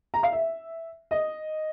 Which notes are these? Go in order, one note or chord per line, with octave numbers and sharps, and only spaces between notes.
A#5
F5
E5
D#5